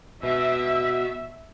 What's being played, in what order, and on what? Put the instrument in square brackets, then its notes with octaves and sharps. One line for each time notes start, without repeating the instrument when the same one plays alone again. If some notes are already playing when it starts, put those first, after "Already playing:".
[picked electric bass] B2 [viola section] E5